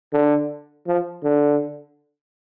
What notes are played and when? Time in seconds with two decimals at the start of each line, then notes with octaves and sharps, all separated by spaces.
0.13 D3
0.87 F3
1.23 D3